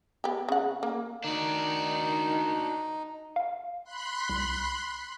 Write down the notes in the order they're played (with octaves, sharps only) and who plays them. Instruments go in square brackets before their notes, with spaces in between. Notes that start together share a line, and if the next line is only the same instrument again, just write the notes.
[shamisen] B3 G4
C#3 F#5
A#3
[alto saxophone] D#3 [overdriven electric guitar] D4 F#4 [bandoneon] D#4
[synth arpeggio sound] F5
[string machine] B5 C6 F#6
[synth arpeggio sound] C2